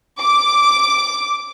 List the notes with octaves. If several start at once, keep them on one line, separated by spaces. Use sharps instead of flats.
D6